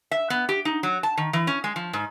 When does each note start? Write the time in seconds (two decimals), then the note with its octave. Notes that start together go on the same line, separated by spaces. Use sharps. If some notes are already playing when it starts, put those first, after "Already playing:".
0.11 E5
0.30 B3
0.49 G4
0.65 D#4
0.83 F#3
1.03 A5
1.17 D#3
1.33 E3
1.47 C#4
1.64 G#3
1.76 F3
1.93 G#2